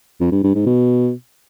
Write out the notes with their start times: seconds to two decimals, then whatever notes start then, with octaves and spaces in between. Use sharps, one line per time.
0.21 F2
0.32 G2
0.43 G2
0.55 G#2
0.66 B2